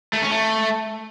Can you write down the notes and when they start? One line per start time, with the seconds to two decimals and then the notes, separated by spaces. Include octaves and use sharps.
0.13 A3
0.22 C#4
0.31 A3